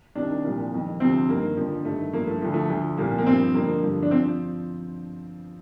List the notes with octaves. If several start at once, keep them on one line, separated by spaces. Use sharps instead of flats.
C2 C3 D#3 D4
C2 A#2 F3
F2 D#3
D2 C3 F3 C4
G2 D#3 A#3
F2 D3 F3
G2 D#3 A3
G2 F3 A#3
A3
D2 D3 F3
A3
D2 D3 F3
C2 A#2 F3 A#3
A#3
G2 F3 C4
F2 D3 F3 A#3
G2 D3 F3
D4
F3 C4